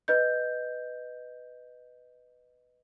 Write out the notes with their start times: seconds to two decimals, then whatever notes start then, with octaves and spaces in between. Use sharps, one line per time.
0.08 B4 D#5 G6